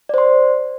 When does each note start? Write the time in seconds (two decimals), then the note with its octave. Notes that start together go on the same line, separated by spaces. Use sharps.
0.09 D5
0.14 C5
0.18 C6